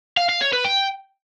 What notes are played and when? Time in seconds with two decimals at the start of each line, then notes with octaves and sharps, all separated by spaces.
0.17 F5
0.29 F5
0.41 C#5
0.53 B4
0.65 G5